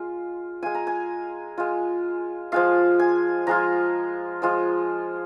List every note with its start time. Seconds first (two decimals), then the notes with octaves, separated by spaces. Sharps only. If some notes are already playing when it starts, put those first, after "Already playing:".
Already playing: G#3 F4
0.63 G#3 F4 G#5
0.75 A#5
0.87 G#5
1.58 G#3 F4
2.52 F3 G#3 F4 F5
2.99 G#5
3.47 F3 G#3 F4 A#5
4.42 F3 G#3 F4